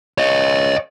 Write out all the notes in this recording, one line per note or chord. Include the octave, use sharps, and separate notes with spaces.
C#5 D#5